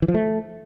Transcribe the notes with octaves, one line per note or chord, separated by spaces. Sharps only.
E3
F3
A3